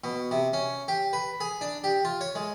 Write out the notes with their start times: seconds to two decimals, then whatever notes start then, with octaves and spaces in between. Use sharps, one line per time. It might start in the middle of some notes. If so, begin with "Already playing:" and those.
0.04 B2
0.31 C3
0.53 C#4
0.88 G4
1.13 B4
1.41 G#4
1.61 D4
1.84 G4
2.05 F4
2.21 C#5
2.35 G#3